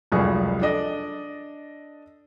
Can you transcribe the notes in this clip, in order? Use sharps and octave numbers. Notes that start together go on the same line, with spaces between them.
F1 C#2 F#2 G3 G#4 C#6
D4 A4 D5 D#5